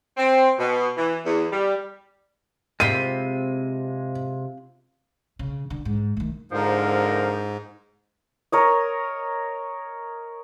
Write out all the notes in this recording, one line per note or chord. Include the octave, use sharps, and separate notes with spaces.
C4
B2
E3
E2
G3
C3 G#3 C4 F4 B5 D#7
C#3
D3
G#2
D#3 A3
G#2 D3 F3 A#4
A#4 C#5 D#5